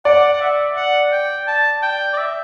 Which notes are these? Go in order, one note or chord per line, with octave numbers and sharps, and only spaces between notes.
D5 F#5
F#5
E5
F#5
G5
A5
G5
D5
E5